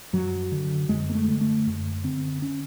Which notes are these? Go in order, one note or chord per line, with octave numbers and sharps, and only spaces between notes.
F#2 F#3
D3
F#2 G#3
A#3
A3
D3
A3
F#2
D3 C4
C#4